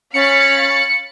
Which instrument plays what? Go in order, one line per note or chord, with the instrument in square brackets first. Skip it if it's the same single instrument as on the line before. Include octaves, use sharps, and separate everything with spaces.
[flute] C#4 [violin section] F5 B5 A6 [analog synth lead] C#7